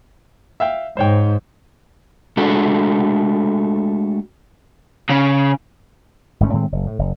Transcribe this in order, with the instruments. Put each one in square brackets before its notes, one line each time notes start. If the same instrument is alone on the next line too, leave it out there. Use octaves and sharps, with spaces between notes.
[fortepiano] E5 F5 G5
[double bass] G#2 [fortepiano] C5 C#5 G5
[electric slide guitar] G#3 A3 D4 F#4 A4
[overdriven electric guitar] C#3
[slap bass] G1 G#2 A3 C#4
A2 D#3 G#3 C4
F#1
A2
F#1